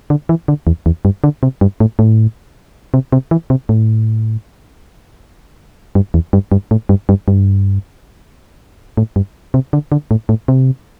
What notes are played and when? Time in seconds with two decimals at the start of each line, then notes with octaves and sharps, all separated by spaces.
0.10 D3
0.29 E3
0.48 D3
0.67 E2
0.86 E2
1.05 G2
1.24 D3
1.43 C3
1.61 G2
1.80 A2
1.99 A2
2.94 C3
3.12 C3
3.31 E3
3.50 C3
3.69 A2
5.95 G2
6.14 E2
6.33 G2
6.52 G2
6.71 A2
6.89 G2
7.09 G2
7.28 G2
8.97 A2
9.16 G2
9.54 C3
9.73 D3
9.92 D3
10.11 A2
10.29 A2
10.48 C3